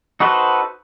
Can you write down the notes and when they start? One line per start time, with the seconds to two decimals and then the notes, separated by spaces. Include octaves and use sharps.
0.20 D#4 F#4 A4 B4 C5